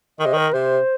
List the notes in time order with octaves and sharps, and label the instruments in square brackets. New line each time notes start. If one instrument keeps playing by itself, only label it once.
[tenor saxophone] D#3 [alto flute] D#5
[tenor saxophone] C3
[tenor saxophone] D#3 [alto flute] A#4
[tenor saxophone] C3 [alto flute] C5